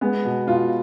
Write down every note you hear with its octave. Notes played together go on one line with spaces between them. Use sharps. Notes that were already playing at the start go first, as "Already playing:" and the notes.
G#3 B3
B2
B2 F4